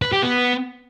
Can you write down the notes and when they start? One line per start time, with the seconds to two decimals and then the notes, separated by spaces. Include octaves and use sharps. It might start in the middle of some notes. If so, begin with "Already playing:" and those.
0.02 B4
0.13 G4
0.23 B3